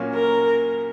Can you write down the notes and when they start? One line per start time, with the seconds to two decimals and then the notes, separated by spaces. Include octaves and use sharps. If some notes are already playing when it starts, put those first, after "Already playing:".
Already playing: A#2 F#3 A#3 C#4
0.15 A#4